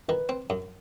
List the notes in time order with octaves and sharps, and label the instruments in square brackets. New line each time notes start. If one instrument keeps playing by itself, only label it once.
[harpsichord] D#3 [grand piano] B4
[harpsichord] C4
F#2